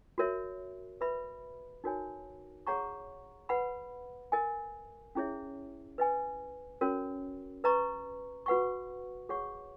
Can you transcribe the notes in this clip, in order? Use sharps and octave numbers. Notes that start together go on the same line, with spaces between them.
F#4 A#4 C#5 E5
B4 E5 B5
D#4 F#4 A#4 C#5 G#5
G#4 C#5 F#5 A#5 C#6
B4 F#5 B5
A#4 D#5 G#5
C#4 E4 G#4 C#5 E5
B4 D#5 G#5
C#4 F#4 A#4 C#5
B4 D#5 A#5 C#6
F#4 B4 F#5 C#6
G#4 C#5 F#5 C#6